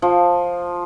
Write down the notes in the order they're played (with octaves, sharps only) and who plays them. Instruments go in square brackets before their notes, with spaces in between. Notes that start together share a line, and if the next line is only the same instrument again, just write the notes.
[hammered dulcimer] F3